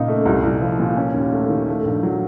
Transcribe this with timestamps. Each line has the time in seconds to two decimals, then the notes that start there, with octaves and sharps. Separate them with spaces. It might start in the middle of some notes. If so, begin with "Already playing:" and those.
Already playing: A#2 C#3 D#4
0.08 A3
0.26 C2
0.43 C2
0.61 F3
0.80 A#2
0.97 C#4
1.14 D#2
1.32 A3
1.49 D#3
1.68 A3
1.85 A#1
2.03 F#3